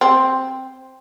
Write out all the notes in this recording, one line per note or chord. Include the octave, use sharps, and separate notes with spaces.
C4